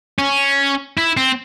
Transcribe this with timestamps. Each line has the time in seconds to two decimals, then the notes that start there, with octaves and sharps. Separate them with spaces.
0.19 C#4
0.98 E4
1.17 C4